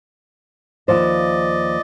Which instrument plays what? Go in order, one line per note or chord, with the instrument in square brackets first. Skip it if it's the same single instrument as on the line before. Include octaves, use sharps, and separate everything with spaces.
[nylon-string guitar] D#2 F3 C5 [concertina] D5 D#5